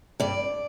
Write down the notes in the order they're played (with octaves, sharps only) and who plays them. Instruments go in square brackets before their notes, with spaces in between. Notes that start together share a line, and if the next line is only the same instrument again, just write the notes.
[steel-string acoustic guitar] G2 D5